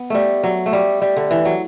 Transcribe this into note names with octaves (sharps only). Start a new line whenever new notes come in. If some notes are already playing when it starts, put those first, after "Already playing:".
Already playing: B3
G3 A3
F#3
A3
G3
G3
D3
E3
F#3